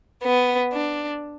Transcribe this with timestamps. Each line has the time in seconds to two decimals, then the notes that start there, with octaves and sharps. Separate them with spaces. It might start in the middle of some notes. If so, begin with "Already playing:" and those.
0.24 B3
0.73 D4